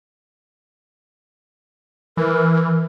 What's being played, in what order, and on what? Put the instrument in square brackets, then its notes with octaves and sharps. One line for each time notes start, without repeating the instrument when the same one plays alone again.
[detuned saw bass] E3 [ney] A#4